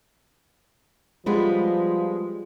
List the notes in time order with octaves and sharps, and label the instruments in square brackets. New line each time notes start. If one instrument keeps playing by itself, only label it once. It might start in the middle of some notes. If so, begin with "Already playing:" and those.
[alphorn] F3 [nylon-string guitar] G3 G#3 B3